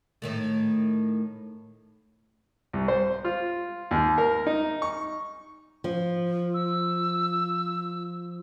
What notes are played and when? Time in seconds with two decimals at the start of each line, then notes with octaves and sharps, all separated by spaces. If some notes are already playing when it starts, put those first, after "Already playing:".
0.22 A2 D#3 A3
2.73 C2
2.88 C5
3.25 F4
3.91 D#2
4.18 A#4
4.47 D#4
4.82 C#6
5.84 F3
6.54 E6